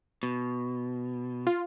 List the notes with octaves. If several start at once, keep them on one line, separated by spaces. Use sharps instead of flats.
B2
F4